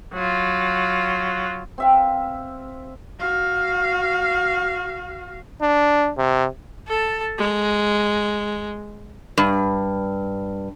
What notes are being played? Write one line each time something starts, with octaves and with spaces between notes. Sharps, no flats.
F#3 F4
C4 E5 F5
F#4 F5
D4
C3
A4 A5
G#3
G2